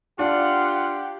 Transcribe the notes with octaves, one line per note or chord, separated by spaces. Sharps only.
D4 F4 G4 F#5